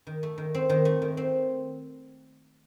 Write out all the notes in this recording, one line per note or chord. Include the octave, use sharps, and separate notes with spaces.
D#3
A3
D#3
C4
D#3
A3
D#3
C4